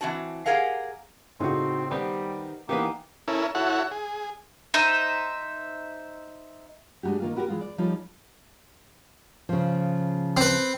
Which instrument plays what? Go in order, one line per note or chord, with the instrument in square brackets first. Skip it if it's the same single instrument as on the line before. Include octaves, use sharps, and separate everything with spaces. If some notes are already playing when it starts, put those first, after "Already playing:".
[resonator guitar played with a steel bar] E3 C4 F#4 A5
G4 G#4 A#4 F5 F#5
[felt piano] A2 C#3 D4 [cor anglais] C4 [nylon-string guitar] D#4 F#4
[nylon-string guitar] D#3 [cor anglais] G3 [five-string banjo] B3 C4 G4 [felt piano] D5
[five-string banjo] D#3 B3 B4 [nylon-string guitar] E3 D#4 G4 [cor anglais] A#3
[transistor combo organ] C#4 E4 A4 A#4
E4 F#4 A4 C#5 F#5
G#4
[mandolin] D#4 C5 E5
[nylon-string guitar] G#3 D4 D#4 F#4 G4
D#3 A#3 F4
B3 F#4 G4 A4 A#4
E3 G#3 F4
D5
F3 G3 C#4 D#4 F4 A4
C#3 F3
[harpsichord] C4 B4